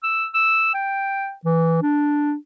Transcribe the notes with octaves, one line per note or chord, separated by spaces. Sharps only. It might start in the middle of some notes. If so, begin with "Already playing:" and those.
E6
E6
G5
E3
D4